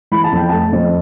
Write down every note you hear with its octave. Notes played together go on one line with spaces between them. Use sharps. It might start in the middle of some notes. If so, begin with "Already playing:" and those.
E3 B5
A5
F2 G5
A3 A5
F2